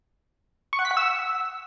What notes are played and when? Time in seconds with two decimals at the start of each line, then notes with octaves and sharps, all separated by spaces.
0.73 C#6
0.79 F#5
0.85 B6
0.91 F#5
0.97 E6